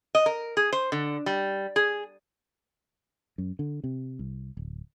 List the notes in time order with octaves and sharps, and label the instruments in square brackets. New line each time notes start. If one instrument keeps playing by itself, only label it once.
[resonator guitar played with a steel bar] D#5
A#4
G#4
C5
D3
G3
G#4
[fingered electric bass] F#2
D3
C3
C2
D1